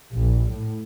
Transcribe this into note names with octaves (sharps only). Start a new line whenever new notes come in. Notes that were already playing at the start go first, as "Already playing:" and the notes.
A#1
A2